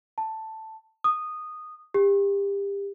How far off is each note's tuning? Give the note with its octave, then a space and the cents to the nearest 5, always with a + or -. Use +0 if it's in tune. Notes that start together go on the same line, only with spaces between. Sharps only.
A5 +5
D#6 -10
G4 +30